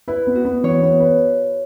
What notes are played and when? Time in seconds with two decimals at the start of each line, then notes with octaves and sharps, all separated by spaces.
0.08 E4 B4
0.27 B3
0.35 F#4
0.45 B3
0.64 E3 C#5
0.82 B3
1.00 B4